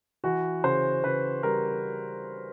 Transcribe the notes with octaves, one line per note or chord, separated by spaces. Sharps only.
E3 F#4
C#3 C5
C#3 B4
G3 A#4